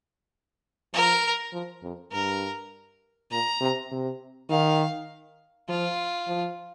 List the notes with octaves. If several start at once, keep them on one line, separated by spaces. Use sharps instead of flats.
F3 A#4
F3
F2
G2 A#4
A#2 A#5
C3
C3
D#3 F5
F3 F4
F3